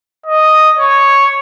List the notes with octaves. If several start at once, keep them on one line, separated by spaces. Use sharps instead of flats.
D#5
C#5